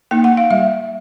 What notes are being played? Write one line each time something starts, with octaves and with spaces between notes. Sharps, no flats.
A#3 D#4 G5
F#5
F5
G3 E5